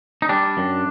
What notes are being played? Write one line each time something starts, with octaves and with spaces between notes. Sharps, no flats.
D#4
G3 D4
F#2